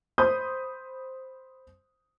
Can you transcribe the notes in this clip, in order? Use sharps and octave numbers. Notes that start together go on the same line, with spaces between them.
C5 B5 C6 D#6 G6